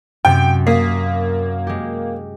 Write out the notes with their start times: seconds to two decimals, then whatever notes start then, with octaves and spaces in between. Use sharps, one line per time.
0.25 F#2 C3 G5
0.67 A#3 D#6 B6 C7
1.67 G#3 G4